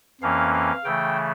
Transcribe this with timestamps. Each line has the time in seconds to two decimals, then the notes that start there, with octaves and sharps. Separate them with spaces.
0.21 F2 E3 A#3 C#4 F5
0.54 F5
0.84 C#3 E3 A3 G5